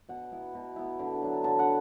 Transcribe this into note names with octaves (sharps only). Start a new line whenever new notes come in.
B2 F#5
B3 E4
B2
B3 E4
D3
F#3 D4
D3 A5
F#5